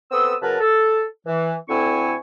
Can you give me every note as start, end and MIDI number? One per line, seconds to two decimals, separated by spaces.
0.11 0.34 59
0.11 0.34 60
0.11 0.34 69
0.11 0.34 87
0.11 0.34 88
0.42 0.59 49
0.42 0.59 54
0.42 0.59 70
0.42 0.59 71
0.42 0.59 81
0.61 1.04 69
1.26 1.55 52
1.69 2.15 38
1.69 2.15 50
1.69 2.15 60
1.69 2.15 64
1.69 2.15 80
1.69 2.15 85